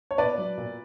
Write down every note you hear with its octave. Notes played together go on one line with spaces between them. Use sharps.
C#5
A#2 B4 D5
F#3
A#2